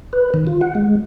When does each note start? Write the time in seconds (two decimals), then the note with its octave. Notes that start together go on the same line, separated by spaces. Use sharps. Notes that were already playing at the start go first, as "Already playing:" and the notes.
0.13 B4
0.34 D#3
0.47 F4
0.61 F#5
0.75 G#3